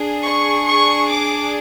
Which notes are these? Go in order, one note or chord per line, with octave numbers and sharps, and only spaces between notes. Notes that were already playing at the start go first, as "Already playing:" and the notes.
Already playing: D4 G#4
C#6
C#6
D6